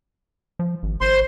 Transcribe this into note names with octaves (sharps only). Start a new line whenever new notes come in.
F3
G#1
G#1 C5 C6